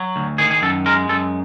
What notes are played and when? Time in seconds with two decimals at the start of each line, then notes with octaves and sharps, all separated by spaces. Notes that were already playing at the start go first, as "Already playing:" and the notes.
Already playing: F#3
0.16 D2
0.38 D#3 G#4
0.51 G#4
0.62 F#2 A4
0.86 G#3 A#4
1.09 F#2 A4